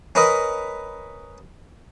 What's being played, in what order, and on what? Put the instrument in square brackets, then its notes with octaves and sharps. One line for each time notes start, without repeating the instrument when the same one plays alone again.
[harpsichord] C#4 A#4 B4 D#5 B5